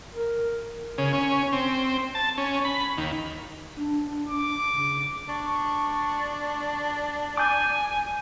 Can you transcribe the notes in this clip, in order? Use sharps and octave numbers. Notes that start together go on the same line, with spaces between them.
A#4
C#3
C#4
C4
A5
C#4
B5
D#2
D4
D6
C#3
D4 C#6
G#5 D6 G6